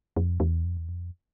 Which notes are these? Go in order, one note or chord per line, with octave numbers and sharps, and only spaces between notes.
F2
E2
F2
E2
F2